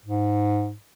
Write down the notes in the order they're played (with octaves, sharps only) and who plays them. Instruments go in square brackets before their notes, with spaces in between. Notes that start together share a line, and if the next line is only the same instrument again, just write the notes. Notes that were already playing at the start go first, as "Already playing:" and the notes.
[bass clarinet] G#2